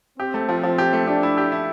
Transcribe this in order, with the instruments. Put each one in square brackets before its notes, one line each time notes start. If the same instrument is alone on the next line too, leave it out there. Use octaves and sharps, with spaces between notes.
[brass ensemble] C4 [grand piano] G4
[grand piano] A3
F3
F3
G4
A3
[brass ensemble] D4 [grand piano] G4
[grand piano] E4
G4
E4